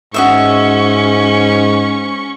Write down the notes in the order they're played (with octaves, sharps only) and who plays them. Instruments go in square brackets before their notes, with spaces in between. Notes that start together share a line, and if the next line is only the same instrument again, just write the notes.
[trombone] G#2 [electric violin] C#4 C#6 [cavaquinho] F#4 D#5 E5